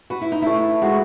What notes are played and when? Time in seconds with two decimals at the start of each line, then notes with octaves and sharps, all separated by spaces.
0.10 F#4 B4
0.21 E4
0.32 D#4
0.42 A3 E4
0.82 G#3 F#4